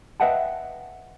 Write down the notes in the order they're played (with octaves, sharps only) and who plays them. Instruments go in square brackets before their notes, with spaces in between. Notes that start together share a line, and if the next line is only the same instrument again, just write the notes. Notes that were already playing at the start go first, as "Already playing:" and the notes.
[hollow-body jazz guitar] B4 D#5 E5 F#5 G5 A5